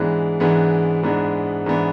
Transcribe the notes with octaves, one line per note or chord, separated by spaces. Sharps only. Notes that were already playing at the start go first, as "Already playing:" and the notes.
Already playing: G#2 E3 G#3 B3 D4
G#2 E3 G#3 B3 D4
G#2 E3 G#3 B3 D4
G#2 E3 G#3 B3 D4